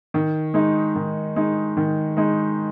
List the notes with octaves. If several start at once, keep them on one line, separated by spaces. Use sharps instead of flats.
D#3
G#3 D#4
D#3
G#3 D#4
D#3
G#3 D#4